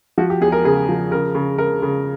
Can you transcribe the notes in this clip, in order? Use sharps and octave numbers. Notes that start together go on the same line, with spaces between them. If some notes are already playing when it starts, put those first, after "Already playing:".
F3 F#4
G4
E2 G#4
A#4
C#3 G#4
F3
C#3 A#4
C#3
C#3 A#4
C#3